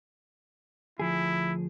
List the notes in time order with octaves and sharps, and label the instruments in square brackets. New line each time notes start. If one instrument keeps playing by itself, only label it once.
[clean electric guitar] D2 F3 G#4 [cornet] E4